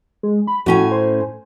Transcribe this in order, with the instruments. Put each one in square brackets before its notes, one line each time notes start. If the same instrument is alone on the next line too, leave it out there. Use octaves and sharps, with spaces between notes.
[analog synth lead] G#3
B5
[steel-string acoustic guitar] A2 C#4 G#5 [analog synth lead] F#4
[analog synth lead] C5